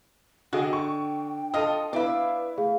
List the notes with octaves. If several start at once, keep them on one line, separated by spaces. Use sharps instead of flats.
D3 F#4 G#4 D#5 G5
C#6
F4 A4 D#5 D#6
B3 E4 B4 D5 E5 F5
A3 G#4 F5